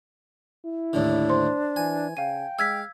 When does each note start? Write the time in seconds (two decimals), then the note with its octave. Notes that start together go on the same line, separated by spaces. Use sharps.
0.65 E4
0.93 D#2 A2 D3 D4
1.30 C5 C6
1.76 E3 G#5
2.17 C#3 F5 G5 D#7
2.59 G#3 F5 E6 G#6 B6